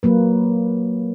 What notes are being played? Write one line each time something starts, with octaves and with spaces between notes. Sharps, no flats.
F#3 A#3 B4